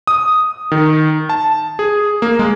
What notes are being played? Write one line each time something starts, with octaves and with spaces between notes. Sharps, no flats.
D#6
D#3
A5
G#4
A#3
G#3